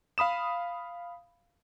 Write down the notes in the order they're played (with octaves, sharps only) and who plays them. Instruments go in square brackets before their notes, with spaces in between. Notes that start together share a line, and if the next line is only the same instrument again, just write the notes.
[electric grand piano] F5 B5 D#6 E7